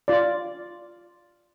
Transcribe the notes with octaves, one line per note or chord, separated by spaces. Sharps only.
F4 D5